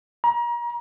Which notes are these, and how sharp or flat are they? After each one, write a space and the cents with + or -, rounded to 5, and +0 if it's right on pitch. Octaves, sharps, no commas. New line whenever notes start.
A#5 +35